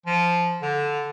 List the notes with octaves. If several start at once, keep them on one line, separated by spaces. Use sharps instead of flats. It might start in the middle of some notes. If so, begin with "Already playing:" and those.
F3
D3